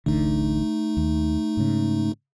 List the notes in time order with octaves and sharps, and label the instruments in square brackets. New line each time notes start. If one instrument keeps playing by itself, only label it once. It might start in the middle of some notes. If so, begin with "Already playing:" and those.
[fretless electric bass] D1 A1 D3 [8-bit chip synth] A3 D#4
[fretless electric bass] D#2
G#2 C#3